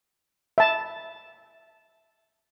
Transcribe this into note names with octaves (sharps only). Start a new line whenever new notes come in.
E5 A5